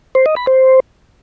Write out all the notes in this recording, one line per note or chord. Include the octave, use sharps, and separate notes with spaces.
C5
D#5
B5
C5